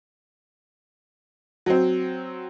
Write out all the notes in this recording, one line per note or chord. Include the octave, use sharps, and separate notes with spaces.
F#3 C4